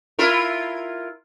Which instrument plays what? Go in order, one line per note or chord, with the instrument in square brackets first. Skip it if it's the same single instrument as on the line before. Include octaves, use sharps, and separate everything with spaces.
[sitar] E4 F4 A#4